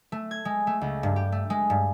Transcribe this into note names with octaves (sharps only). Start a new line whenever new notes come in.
A3
G#6
G#3
A3
C#2
G2
G4
A3
G#3
G2